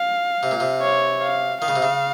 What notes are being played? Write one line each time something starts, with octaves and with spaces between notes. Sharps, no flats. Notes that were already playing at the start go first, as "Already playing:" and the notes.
Already playing: F5
C3
A#2
C3
C#5
F5
D#3 F5
C#3
C3
C#3